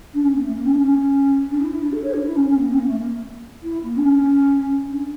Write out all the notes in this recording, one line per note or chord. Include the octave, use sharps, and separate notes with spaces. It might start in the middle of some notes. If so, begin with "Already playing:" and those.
D4
C#4
A#3
A3
A#3
C#4
D4
C#4
D4
E4
E4
D4
A4
C#5
D4
E4
C#4
C#4
A#3
C#4
A#3
A3
A#3
E4
A#3
D4
C#4
D4